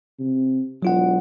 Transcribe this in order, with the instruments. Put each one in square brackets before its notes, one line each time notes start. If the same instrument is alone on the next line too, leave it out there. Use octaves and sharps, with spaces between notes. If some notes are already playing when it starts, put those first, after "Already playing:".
[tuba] C3
[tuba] E1 [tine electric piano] F#3 F4 F#5